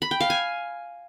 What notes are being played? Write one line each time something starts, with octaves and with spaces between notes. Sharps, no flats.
B5
G5
F5
G#5